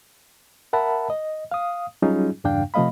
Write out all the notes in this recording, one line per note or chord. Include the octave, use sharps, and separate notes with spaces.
A#4 E5 F#5 A5 B5
D#5
F5 D#6
F#3 G3 C#4 D#4 F4 G#4
E2 G2 C#3 D4 F5 G5
C3 F3 A3 D#5 F5 B5